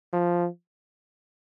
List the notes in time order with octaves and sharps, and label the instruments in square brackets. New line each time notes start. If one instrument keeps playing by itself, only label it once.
[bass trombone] F3